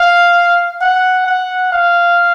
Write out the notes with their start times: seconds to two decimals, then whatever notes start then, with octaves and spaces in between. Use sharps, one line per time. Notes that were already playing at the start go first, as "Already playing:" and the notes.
Already playing: F5
0.81 F#5
1.26 F#5
1.72 F5